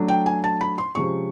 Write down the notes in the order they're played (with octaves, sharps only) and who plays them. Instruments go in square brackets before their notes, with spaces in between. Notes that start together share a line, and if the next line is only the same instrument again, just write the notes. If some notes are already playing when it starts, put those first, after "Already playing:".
Already playing: [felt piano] F#3 A3 D4
G5
G#5
A5
B5
C6
C3 F3 G#3 C#4 C#6